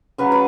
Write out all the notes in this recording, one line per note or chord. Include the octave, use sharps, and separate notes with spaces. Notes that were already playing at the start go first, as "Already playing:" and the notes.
C#3 F#3 B4
B4